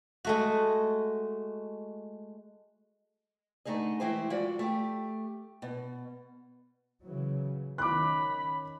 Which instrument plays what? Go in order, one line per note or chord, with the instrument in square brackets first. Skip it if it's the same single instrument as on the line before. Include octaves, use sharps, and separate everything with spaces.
[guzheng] G#3 A3 F#4
[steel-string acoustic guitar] D3 A3 D#4 G#4 D#5
E3 G#3 A3 E4 G4 C5
F3 G#3 F#4 A4 D5
A3 G4
B2
[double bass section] C#3 E3 F#3
[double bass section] D#3 C#4 [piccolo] B5 [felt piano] D6 F#6